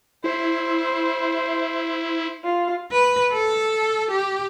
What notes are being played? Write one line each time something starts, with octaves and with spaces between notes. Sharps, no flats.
E4 C5
F4
B4
A4
G4